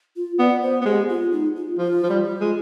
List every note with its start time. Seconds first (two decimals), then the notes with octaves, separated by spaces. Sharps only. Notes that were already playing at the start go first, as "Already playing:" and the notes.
0.16 F4
0.39 B3 D5
0.62 C5
0.81 B3
0.86 G#3 G4
1.09 F4
1.32 D#4
1.56 F4
1.79 F3 F4
2.03 F3
2.09 G3
2.26 F4
2.41 G#3